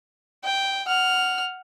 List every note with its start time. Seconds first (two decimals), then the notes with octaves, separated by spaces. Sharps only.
0.44 G5
0.87 F#5 F6